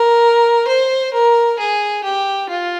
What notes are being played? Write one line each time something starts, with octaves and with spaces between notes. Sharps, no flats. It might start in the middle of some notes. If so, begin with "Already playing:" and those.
Already playing: A#4
C5
A#4
G#4
G4
F4